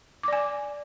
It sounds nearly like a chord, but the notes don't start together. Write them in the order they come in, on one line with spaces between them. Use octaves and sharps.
D6 D5 G#5